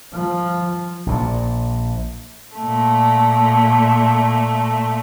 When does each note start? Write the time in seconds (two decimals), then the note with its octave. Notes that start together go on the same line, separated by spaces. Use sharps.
0.13 F3
1.06 A#1 A#2
2.57 A#2 A3